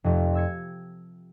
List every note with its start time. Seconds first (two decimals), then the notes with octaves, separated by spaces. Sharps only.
0.04 F1 F2
0.35 E6 G#6 C#7